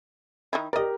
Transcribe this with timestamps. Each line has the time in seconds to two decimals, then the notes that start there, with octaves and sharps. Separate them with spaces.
0.53 D#3 D#4 E4
0.73 G4 A#4 D5 D#5